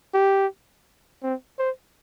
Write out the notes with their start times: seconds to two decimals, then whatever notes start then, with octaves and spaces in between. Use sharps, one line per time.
0.14 G4
1.23 C4
1.59 C5